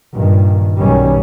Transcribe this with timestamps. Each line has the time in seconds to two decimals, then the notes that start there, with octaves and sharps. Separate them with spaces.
0.14 G2 A#2 D#3
0.77 B1 D#3 G3 C#4